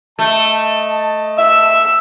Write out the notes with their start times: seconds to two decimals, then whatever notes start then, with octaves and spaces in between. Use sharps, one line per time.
0.19 A3 D#5 A5
1.38 E5 E6